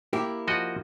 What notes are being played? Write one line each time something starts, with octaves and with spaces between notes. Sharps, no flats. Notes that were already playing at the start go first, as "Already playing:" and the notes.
A#3 E4 G4
F3 F#4 D#5